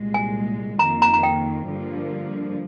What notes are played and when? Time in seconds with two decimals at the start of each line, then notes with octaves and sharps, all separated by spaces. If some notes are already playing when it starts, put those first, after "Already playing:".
Already playing: C2 A#2 G#3
0.14 G#5
0.79 F2 D#3 A#3 A#5
1.02 A#5
1.13 A#5
1.23 G5
1.68 G2 D3 F3 A#3